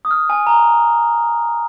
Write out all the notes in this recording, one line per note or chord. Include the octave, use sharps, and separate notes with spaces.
D#6
F6
G#5
A#5